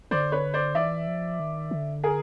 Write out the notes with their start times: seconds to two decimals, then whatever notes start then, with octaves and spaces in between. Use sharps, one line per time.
0.11 D3 C5 D5
0.32 B4 C#5
0.54 C5 D5
0.75 E3 D5 E5
1.07 F3
1.40 D#3
1.71 D3
2.03 G#4 A#4